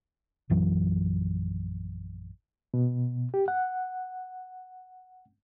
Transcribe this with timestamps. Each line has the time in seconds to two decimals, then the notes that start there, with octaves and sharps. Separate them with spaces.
0.50 A#1 F#2 E3 F#3
2.74 B2
3.34 G4
3.48 F#5